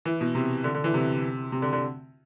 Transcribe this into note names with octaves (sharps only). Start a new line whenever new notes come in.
E3
B2
C3
D3
D3
E3
C3
C3
D3
D3